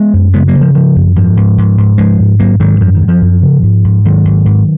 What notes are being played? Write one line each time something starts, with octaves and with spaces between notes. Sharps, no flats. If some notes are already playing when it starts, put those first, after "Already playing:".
Already playing: G#3 B3
F#2
C#3 G#3 B3
F#3 A#3
C#3
F3
C#3 F3
F#2
G#2 F3
G#2
G#2
G#2
G#2 F3 G#3
G#2
G#2 F#3 A#3
G#2 D#3 F#3
F#2 F3
D#3
F#2
F3
F#2
C#3
G#2
G#2
G#2 D#3 F#3
G#2
G#2